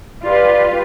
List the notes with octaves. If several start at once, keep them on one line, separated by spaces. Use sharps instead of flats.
F4 G4 B4 D5